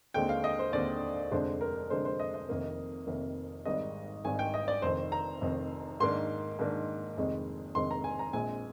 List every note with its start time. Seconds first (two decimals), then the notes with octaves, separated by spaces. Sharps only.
0.14 D#2 D3 G#3 C4 G5
0.29 F5
0.44 D#5
0.59 C5
0.73 D#2 D3 G#3 C4 D5
1.31 F1 F2 D3 G#3 D4 C5
1.61 A#4
1.90 F1 F2 D3 G#3 D4 C5
2.05 C5
2.20 D#5
2.34 D#5
2.49 F1 F2 C3 D#3 A#3
3.07 F1 F2 C3 D#3 A#3
3.65 G#1 G#2 D#3 G3 D#5
4.25 G#1 G#2 D#3 G3 G#5
4.39 G5
4.54 D#5
4.68 D5
4.82 F1 F2 D#3 C5
5.12 A#5
5.41 F1 F2 D#3
6.00 G#2 D#3 A#3 D4 C6
6.59 G#2 D#3 A#3 D4
7.17 F1 F2 D#3 G#3
7.75 F1 F2 D#3 G#3 C6
7.91 A#5
8.04 G#5
8.19 A#5
8.33 A#1 A#2 G#3 C4 G#5